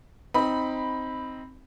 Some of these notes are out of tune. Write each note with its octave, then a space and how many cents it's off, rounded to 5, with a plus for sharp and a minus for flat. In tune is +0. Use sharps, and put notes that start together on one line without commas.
C4 +0 D#4 +10 B5 +0